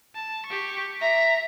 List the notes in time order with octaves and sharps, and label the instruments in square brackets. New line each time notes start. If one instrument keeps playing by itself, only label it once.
[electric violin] A5
G4 C#6
[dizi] E5 [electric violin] A#5